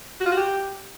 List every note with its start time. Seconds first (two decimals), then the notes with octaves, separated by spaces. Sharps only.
0.20 F#4
0.26 F4
0.31 F#4
0.37 G4